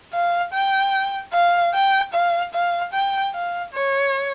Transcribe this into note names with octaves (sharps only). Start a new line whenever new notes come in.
F5
G5
F5
G5
F5
F5
G5
F5
C#5